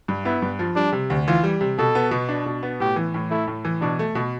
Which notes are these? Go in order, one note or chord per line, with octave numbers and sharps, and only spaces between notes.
G2
B3 E4
G2
F3
G3 D4
C3
D2
E3 F4
G3
C3
B2 A4
B3
B2
D4
B2
B3
A2 G4
E3
A2
A3 E4
A2
E3
B2 D4
A3
B2